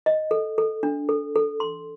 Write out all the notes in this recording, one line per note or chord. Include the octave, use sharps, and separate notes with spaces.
D#5
A4
A4
D4
A4
A4
C6